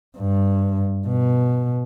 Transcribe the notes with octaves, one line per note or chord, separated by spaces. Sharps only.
G2
B2